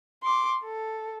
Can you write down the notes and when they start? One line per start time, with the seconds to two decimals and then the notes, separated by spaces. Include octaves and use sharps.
0.23 C6 D6
0.64 A4